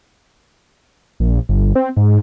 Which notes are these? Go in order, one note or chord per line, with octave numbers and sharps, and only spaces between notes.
A#1
G1
C4
G#2